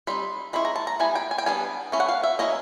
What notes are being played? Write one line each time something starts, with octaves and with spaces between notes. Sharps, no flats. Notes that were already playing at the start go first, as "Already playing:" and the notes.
G3 C4 D#4 B5
G#3 C#4 E4 B5
A#5
A5
A#5
G3 B3 E4 G#5
G5
G#5
G5
G3 B3 D4 G#5
A3 C#4 E4
F#5
F5
E5
F#3 A#3 C#4 E4 D#5